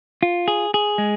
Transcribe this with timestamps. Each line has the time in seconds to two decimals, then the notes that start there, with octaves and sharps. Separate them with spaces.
0.23 F4
0.48 G#4
0.74 G#4
0.98 G#3